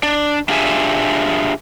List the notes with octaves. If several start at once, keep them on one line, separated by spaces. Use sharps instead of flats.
D4
D4 F4 G4 G#4 E5 G#5